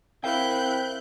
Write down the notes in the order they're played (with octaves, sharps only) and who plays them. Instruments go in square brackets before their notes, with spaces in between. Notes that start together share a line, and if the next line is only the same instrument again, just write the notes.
[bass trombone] C4 [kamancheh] E4 [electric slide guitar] A#4 F5 G5 [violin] F#6 G6